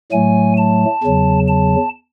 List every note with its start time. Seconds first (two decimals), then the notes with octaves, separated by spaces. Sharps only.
0.12 A2 F#3 A3 G#5
0.58 A5
1.04 E2 C#3 F#3
1.48 A5